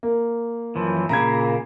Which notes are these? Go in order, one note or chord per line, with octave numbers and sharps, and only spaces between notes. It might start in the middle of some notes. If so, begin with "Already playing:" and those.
A#3
F#2 E3 F3
A#2 C#3 A#3 A#5 B5 G#6